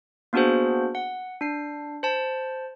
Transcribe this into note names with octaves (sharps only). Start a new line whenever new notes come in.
A#3 B3 D4 F#4 G#4 C5
F#5
D4 C7
C5 A5